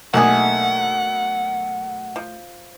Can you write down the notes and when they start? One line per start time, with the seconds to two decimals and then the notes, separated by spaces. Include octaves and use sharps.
0.14 B1 D#3 A3 A#3 D4 G#4 F#5
2.16 F3